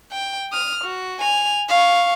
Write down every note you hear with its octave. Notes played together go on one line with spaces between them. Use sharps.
G5
D#6 F6
F#4
G#5 F7
F5 C#6